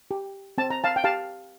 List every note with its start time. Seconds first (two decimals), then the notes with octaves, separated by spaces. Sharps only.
0.11 G4
0.58 C4 A5
0.70 A#5
0.84 F5 A5
0.96 G5
1.04 G4 F5 A5